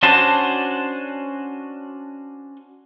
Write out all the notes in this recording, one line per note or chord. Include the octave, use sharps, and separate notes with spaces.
C#4 D4 F#4 C5 A5